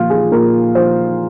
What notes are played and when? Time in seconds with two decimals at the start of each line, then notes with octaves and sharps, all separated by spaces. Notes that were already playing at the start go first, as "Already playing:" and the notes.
Already playing: A#2 F3 F4
0.10 G#4
0.31 A#2 A#4
0.75 F3 C5